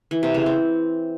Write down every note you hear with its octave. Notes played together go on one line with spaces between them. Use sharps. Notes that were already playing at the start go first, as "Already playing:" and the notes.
E3
C3
C#3
C4